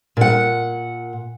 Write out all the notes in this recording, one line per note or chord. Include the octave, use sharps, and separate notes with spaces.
A#2 F#5